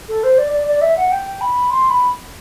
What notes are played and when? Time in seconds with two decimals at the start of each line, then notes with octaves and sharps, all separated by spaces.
0.09 A4
0.24 C5
0.38 D5
0.52 D5
0.67 D5
0.81 E5
0.97 F#5
1.11 G5
1.41 B5
1.71 C6
1.90 B5